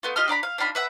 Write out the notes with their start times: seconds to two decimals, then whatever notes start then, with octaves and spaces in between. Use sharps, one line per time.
0.03 A3 B3 F4
0.16 F4 G4 D#5 F6
0.28 D4 D5 A#5 B5
0.43 F5
0.58 D4 D#4 F4 B5
0.75 B4 E5 F#5